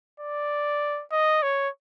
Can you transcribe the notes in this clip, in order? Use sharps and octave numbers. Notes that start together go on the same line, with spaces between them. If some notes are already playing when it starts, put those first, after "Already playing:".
D5
D#5
C#5